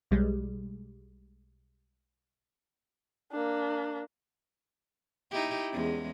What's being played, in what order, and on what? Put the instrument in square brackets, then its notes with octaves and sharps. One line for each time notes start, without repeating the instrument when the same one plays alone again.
[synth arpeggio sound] B1 G3 G#3
[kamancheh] A#3 D4
[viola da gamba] D#4 E4 G4
E2 G#3 C#4